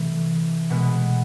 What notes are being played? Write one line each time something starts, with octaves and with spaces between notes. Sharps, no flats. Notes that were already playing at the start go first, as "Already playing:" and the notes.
Already playing: C3 E3 A3
B2 G#3 B3